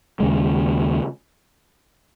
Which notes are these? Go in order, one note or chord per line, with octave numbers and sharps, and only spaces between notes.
D#2 C#3 G#3